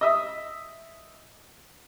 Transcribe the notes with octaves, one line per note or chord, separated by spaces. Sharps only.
D#5 E5 D#6